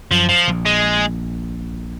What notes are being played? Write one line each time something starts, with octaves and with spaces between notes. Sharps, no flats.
F#2 F3
F3
A#1 A#2
G#3